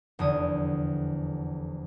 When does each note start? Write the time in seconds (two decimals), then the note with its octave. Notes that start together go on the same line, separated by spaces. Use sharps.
0.19 F1 E2 D3 D#6